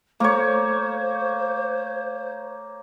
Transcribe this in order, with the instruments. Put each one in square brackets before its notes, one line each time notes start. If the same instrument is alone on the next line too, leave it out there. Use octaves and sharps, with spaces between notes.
[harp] A3 [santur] A#3 C#5 [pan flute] C5